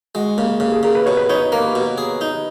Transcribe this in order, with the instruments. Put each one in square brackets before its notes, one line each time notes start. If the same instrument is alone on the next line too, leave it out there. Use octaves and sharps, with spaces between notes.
[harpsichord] G#3 [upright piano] F#4
[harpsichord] C#3 [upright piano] A#3
[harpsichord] C#3 [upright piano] A#3
[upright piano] G#4
[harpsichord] C#3 [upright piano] A#4
[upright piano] B4
[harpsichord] B2 [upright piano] C#5
[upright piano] B4
[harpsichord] D#4 [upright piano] C#5
[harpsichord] A#3 [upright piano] A#4
[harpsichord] B2
G#4
D#4